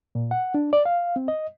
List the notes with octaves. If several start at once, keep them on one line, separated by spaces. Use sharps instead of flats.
A#2
F#5
D4
D5
F5
C4
D#5